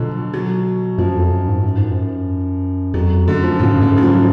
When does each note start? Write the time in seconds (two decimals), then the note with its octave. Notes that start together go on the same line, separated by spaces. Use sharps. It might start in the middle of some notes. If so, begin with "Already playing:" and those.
Already playing: B2 D3 F3 F#3
0.34 F#3
0.98 F#2 F3
1.15 F2
1.31 F#2
1.48 G#2
1.64 F#2
1.77 G#2
1.91 F#2
2.94 F2 F#3
3.28 F#2 D3
3.43 F3
3.59 A2 C#3
3.68 G#2
3.75 F#2
3.81 G#2 C#3
3.98 F#3
4.03 F3